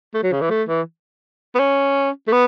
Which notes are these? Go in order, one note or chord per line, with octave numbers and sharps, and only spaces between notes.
A3
F#3
C#3
E3
A3
E3
B3
C#4
A3
B3